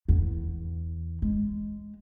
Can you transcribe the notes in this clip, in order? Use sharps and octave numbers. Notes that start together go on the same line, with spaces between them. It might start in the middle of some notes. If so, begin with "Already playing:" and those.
E2
G#3